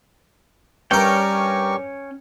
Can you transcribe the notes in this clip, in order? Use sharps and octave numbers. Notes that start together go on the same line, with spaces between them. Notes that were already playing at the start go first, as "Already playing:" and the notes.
G2 C#4 G4 A#4 C#5 G5 C#6